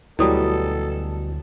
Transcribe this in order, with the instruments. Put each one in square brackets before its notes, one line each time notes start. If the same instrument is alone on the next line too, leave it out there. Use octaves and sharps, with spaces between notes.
[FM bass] D2 [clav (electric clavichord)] B2 F#3 G3 [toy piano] E4 D#6 [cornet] A4